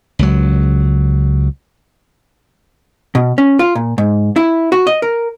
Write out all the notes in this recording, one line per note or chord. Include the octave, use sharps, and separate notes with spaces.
C#2 F#3
B2
C#4
F4
A#2
G#2
E4
F#4
D#5
A#4